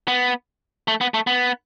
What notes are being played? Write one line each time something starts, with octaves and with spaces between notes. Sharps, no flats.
B3
A3
B3
A3
B3